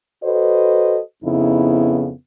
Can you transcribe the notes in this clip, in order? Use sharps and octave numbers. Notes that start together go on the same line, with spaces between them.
F#4 A4 B4 C5 D#5
F2 C#3 B3 D#4 E4